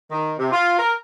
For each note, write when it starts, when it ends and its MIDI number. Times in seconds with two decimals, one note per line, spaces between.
0.11 0.34 51
0.39 0.52 48
0.52 0.76 65
0.79 0.93 70